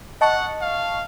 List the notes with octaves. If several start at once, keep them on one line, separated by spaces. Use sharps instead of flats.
D#5 F#5 A5 C#6
F5